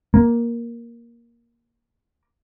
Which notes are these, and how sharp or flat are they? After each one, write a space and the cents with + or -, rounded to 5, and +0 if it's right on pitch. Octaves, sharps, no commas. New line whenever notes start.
A#3 +10